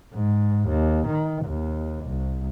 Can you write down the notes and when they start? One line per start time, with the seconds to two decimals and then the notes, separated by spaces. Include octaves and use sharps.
0.13 G#2
0.68 D#2
1.08 D#3
1.46 D#2
2.05 C2